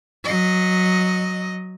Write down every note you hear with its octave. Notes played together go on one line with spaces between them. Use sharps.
F#3 D#5